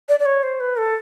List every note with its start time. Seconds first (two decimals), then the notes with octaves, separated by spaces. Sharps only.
0.09 D5
0.20 D5
0.26 C#5
0.43 C5
0.60 B4
0.77 A4